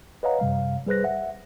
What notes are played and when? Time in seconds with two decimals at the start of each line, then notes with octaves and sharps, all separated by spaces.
0.23 B4 C#5 D#5 F5 F#5 A#5
0.40 F#2 C3 G3 F5
0.87 G3 G#4 B4 C5 F#6 A#6
1.04 E5 F#5